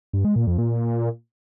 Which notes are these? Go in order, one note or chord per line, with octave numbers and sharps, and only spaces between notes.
G2
G#3
A#2
F2
A#2